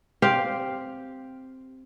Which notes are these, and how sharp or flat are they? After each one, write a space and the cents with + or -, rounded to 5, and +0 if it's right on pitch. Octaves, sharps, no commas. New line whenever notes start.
C4 +0 G4 +0 F5 +0